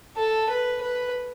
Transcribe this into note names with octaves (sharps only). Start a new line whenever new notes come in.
A4
B4
B4